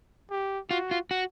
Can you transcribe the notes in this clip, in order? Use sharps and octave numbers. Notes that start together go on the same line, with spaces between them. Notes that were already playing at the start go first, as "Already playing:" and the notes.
G4
F4 F#4
F4
F#4